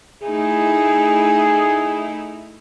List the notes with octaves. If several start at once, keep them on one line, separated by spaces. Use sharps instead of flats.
A3 D#4 E4 G#4